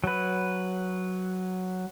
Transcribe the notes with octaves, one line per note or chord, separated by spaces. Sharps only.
F#3 B4